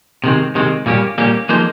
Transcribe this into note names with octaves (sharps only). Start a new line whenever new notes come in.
C3 D#3 G#3 C4
C3 D#3 G#3 C4
A#2 G3 A#3 C#4 G4
A#2 G3 A#3 C#4 G4
F3 A#3 D#4 G#4 C5